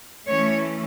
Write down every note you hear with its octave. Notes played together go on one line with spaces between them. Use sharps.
E3 A3 C#4 C#5